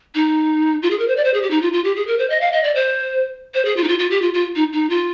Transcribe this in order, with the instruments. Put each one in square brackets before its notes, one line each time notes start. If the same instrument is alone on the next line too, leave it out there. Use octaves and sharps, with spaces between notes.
[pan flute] D#4
F4
G#4
A#4
C5
D5
C5
G#4
G4
D#4
F4
F4
G4
G#4
A#4
C5
D#5
F5
D#5
D5
C5
C5
G#4
F4
D#4
F4
F4
G4
F4
F4
D#4
D#4
F4